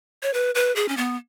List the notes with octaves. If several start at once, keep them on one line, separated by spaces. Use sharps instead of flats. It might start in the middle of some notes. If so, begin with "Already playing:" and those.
C#5
B4
B4
G#4
C#4
B3